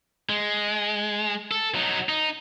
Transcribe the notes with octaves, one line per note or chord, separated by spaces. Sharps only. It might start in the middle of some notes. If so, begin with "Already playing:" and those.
G#3
A4
F#3 D#4
D#4